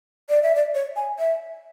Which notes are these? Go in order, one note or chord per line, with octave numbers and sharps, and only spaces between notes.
D5
E5
D5
C#5
G#5
E5